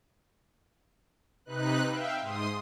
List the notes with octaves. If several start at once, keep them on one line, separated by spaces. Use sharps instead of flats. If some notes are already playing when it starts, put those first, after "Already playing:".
C3 D#4 B4 F#6
E5 F5 G5
G#2 C6 D#6